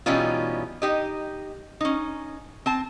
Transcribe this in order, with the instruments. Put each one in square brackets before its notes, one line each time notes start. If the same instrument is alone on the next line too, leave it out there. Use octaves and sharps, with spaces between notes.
[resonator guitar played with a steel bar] B2 E3 G3 C#4 D#4 F4
D#4 G4 D#5
C#4 D#4
C4 A5